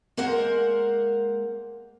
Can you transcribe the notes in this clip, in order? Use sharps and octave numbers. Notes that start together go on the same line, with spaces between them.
G#3 A#3 A#4 C5 F#5